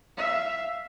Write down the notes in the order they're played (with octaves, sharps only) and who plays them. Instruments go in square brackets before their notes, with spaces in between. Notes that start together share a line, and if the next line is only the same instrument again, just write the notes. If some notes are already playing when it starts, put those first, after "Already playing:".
[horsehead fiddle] E5 F5